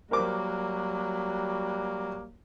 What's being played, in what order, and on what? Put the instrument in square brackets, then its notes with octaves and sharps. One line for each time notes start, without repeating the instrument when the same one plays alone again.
[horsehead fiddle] F#3 F#4 [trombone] G3 [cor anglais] A#3 [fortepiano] A#4 C5 D6